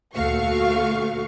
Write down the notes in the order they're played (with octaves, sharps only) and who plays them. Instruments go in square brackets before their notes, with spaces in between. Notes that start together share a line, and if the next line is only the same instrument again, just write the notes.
[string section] D2 A#2 A3 F#4 F5 C#6